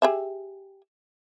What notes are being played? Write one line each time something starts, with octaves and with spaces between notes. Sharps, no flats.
G4 G#4 E5